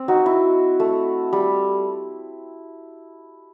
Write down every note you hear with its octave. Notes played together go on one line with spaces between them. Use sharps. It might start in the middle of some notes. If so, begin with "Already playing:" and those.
Already playing: C4
D#4 F#4
E4
A3
G3